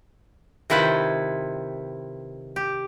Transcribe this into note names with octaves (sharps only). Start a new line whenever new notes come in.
C3 D#3 E4 F4 B4 C5
G4